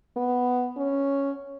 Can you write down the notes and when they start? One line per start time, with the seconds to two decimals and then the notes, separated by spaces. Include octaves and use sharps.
0.17 B3
0.77 C#4